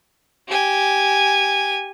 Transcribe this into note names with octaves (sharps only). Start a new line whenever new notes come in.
G4 G#5